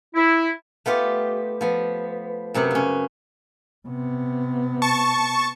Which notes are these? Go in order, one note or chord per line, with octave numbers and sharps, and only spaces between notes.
E4
A3 B3 F4 G4
F3 B3
F#2 C3 B3 F#5
C#3 C#4
C3 B3
A5 C#6